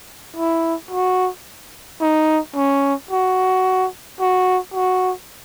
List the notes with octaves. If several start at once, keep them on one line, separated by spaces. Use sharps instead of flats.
E4
F#4
D#4
C#4
F#4
F#4
F#4